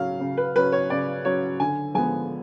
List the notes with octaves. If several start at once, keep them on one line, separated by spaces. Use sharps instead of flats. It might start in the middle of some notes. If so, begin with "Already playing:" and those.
Already playing: C#3 F#3 C#4 F5
C#3
B4
F#3 C#4 B4
C#5
C#3 D5
F#3 C#4 C#5
D3 G#5
F3 G#3 B3 G#5